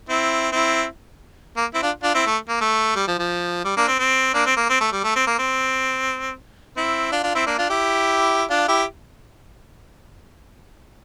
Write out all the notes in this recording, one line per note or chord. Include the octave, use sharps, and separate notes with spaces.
C4 E4
C4 E4
A#3
C4 E4
D4 F4
D4 F4
C4 E4
A3
A#3
A3
G3
F3
F3
G3
A#3 D4
C4
C4
A#3 D4
C4
A#3
C4
A3
G3
A3
C4
A#3
C4
C4 E4
D4 F4
D4 F4
C4 E4
A#3 D4
D4 F4
E4 G4
D4 F4
E4 G4